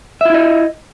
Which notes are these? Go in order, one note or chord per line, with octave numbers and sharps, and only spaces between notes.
E4 F4 D#5 E5